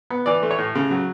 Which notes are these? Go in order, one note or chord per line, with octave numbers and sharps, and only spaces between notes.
B3
E3 D5
A3
C#5
A2
C#3
F#3